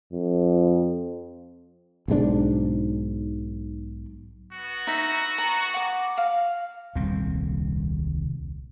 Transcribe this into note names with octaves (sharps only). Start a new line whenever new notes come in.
F2
B1 G#2 G3 D4
B3 F#4
D#4 E5
A#5
F#5 D6
F5
D#1 C2 C4